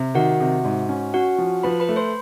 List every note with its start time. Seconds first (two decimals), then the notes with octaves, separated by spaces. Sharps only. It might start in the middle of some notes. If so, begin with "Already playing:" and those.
Already playing: C3
0.15 D#3 F#4 F#5
0.40 C3
0.65 G#2
0.89 C#4
1.14 C#4 F#4 F#5
1.39 F3
1.63 F3 B4 B5
1.80 B4 B5
1.89 A3
1.96 C5 C6